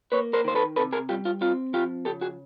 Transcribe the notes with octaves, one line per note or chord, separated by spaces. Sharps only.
A#3 B4 C#5
A#4 C5
D#3 C5
A4 B4
C3 A4 B4
G#4 A#4
G3 F4 G4
F4
C4 F4
F3 F4 G4
C#3 G4 A4
F#4 G#4